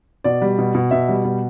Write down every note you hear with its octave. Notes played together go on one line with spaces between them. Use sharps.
B2 D5
G3
B2
B2
B2 E5
G3
B2